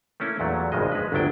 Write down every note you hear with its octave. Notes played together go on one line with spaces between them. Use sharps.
A3 A#3 C#4 E4
E2 A#2 F#3 A3
G#1 G2 C#3 F3 G#3 D#5
G#3 B4
G1 D2 F#3 D4 E4 G5